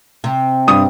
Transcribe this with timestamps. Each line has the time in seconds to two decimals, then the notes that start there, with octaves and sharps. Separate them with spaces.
0.24 C3
0.67 G2 D#6